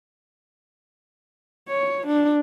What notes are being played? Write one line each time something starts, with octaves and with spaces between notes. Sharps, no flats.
C#5
D4